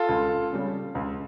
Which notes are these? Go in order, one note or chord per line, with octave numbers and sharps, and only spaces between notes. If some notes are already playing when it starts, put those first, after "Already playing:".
Already playing: F4 A4
C#2
C#3 G3
C#2